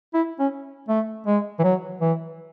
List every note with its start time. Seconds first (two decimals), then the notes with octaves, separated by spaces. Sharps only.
0.14 E4
0.40 C#4
0.89 A3
1.27 G#3
1.59 E3
1.64 F#3
2.01 E3